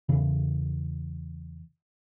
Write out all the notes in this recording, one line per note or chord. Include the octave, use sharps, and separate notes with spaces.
E2 C#3 E3